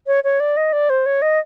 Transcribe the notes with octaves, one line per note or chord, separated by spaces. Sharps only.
C#5
C#5
D5
D#5
D5
C5
C#5
D#5